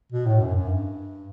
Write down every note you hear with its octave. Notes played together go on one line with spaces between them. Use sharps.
B2
A2
F#2
F#2
G2